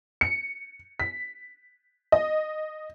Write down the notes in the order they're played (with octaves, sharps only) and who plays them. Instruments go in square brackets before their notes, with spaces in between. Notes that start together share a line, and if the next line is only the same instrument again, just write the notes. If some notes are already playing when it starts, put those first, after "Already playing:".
[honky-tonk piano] C#7
B6
D#5